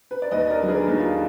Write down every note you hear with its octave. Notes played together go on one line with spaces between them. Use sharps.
B4
D5
D#2 B4 D#5
A#4 D5
D3 F#3
G#4 B4
D#2 D#4
F4